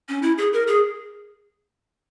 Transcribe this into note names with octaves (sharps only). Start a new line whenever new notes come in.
C#4
E4
G#4
A#4
G#4